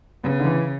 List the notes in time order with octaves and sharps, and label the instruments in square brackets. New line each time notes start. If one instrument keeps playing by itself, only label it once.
[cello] C#3 [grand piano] B3
[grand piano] D3
E3